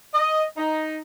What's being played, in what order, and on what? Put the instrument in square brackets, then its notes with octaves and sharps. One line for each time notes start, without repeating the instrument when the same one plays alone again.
[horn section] D#5
D#4